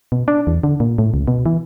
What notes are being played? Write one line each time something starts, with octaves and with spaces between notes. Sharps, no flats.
B2
D4
E2
D3
A#2
A2
C#2
B2
E3